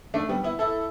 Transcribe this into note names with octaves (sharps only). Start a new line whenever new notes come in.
A3 D4
G3 B3
B3 E4
E4 A4